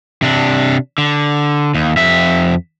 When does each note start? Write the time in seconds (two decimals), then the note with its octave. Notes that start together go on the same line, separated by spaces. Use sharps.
0.22 C3 D4
0.98 D3
1.74 D#2
1.97 F2 E5